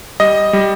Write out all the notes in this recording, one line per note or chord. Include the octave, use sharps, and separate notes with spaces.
G3 D#5
G3